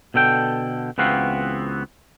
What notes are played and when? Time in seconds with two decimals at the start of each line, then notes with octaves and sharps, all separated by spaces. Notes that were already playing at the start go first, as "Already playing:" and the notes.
0.14 B2 D3 A4 G5
0.98 C#2 E3 B3 C4 F#4 F5